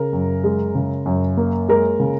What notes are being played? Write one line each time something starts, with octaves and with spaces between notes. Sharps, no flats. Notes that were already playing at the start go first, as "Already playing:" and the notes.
Already playing: C#3 A#4
F#2
G#3
C#3
F#2
A#3
G#3 A#4
C#3